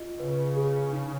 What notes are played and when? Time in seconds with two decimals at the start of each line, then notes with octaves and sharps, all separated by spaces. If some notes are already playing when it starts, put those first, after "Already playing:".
Already playing: F4 D#5
0.19 C#3 B4
0.56 G#4
0.93 D#4